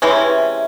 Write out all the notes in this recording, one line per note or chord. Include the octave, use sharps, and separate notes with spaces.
C3 E3 G#3 C#4